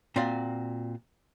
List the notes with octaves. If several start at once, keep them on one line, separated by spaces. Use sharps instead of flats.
A#2 C4 F4 F#4 D5 F5